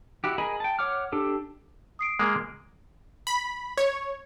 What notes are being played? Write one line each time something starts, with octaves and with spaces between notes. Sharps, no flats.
E4 F#4 G4
G#4 A#4 D#5 B5
G5 A5
C#5 F#5 D6 F6
D4 G4 A4
D#6 C7 D7
G#3 A#3
B5
C#5